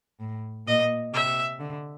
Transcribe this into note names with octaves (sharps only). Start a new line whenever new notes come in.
A2
A#2 D#5
C3 E5
D3